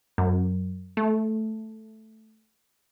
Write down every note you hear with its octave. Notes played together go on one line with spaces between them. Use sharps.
F#2
A3